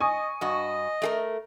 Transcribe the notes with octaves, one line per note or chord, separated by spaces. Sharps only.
D#5 G#5 C#6 D#6
G2 F#4 D#5
A3 G#4 A#4